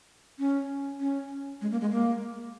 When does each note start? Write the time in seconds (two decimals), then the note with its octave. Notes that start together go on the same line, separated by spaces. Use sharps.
0.39 C#4
1.00 C#4
1.61 G#3
1.71 A#3
1.81 G#3
1.92 A#3